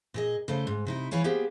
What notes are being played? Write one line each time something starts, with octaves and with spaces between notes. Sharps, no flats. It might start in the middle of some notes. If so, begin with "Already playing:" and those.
A#2 G#4 D#5
C#3 A3 A4 C5
G#2
C3 D#4 E4
E3 E4 F4 C#5 F5 G#5
A#3 B3 G4 G#4 C5